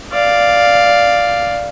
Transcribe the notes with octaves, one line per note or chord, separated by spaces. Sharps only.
D5 F5